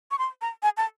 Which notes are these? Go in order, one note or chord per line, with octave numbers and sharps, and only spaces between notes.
C#6
C6
A#5
G#5
A5